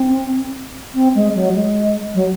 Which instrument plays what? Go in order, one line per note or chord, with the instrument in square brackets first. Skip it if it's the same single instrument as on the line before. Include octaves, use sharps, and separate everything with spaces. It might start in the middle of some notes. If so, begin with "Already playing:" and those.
Already playing: [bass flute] C4
C4
G#3
F#3
G#3
F#3